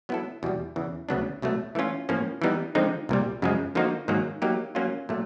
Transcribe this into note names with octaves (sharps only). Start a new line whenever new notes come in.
F#3 B3 E4 A4
E2 B2 G3
E2 C#3 E3
D2 C#3 F#3 B3 D4
C2 B2 F#3 A3
E3 A3 C#4 F4
A2 F3 A#3 C#4
E3 G3 B3 D#4
D3 F3 G#3 C4 D#4
C2 A#2 G3
F#2 C#3 F3 G#3
D3 F3 A#3 D#4 F#4
G#2 D#3 F#3 A#3
F#3 A#3 D#4 G4
F#3 A#3 C#4 F4
A#2 F#3 A3